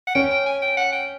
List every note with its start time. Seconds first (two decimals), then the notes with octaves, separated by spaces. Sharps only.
0.07 F#5
0.15 C#4 G5
0.31 G5
0.46 G#5
0.62 G5
0.77 F#5
0.93 G5